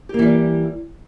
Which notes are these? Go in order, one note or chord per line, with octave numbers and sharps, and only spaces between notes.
E3 G3 A#3 G4